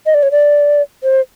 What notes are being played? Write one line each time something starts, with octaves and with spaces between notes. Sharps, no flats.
D#5
D5
C#5
D5
C5